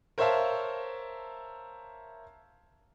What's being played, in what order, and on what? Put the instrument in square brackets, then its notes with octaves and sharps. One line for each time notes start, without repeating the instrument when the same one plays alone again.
[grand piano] A#4 C5 C#5 E5 F5 A5